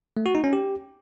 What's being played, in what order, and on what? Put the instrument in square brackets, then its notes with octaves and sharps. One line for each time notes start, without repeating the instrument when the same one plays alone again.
[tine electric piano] A3
F#4
D#4
C#4
G4